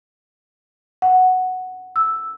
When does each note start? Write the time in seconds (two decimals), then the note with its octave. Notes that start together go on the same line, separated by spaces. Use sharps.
1.02 F#5
1.96 E6